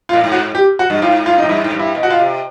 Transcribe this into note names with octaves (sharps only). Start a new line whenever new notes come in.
F4
A2
G#2
F#4
G4
F#4
G2
G#2 F4
F4
G#2 D#4
G2 E4
G#2
G2
E4
B2
F#4
F4
C3